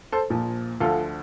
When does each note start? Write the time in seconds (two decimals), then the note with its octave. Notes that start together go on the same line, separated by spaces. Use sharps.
0.12 A4 C5
0.30 A#1 A#2 F3
0.80 D2 D3 F3 F4 A4